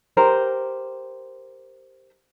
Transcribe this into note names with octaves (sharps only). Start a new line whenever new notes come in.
G4 A#4 C5